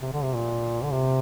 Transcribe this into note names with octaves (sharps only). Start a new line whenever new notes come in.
C3
D3
C3
A#2
D3
C3